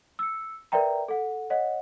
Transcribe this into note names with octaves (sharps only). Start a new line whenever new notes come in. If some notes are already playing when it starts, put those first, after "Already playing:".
E6 C#7
A#4 B4 D5 E5 G5 A#5
A4 F#5
C#5 D#5 F#5